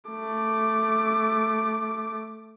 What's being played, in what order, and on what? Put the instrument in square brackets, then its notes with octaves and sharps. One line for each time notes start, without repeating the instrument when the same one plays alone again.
[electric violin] A3 D6